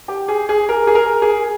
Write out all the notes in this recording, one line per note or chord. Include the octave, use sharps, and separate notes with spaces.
G4
G#4
G#4
A#4
G#4
A#4
G#4